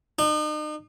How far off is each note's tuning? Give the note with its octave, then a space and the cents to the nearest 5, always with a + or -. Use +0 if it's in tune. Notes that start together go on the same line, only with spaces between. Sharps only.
D#4 -40